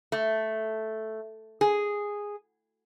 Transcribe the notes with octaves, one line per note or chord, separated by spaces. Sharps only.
A3
G#4